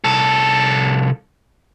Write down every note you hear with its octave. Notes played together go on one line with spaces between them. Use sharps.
C2 A4